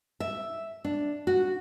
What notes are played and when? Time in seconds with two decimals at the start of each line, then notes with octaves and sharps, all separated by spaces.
0.20 E5
0.85 D4
1.27 F#4